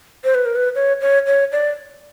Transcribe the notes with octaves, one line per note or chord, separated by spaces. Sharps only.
C5
B4
A#4
B4
C#5
C#5
C#5
D5